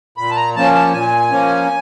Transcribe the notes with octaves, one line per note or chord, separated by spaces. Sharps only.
A#2 B5
A5
A#5
F3 A#3 C#4 A5
A5
A#2 G#5
F3 A#3 C#4